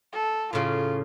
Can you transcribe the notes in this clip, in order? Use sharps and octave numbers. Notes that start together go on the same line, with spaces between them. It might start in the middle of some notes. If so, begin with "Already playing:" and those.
A4
A2 C#3 F4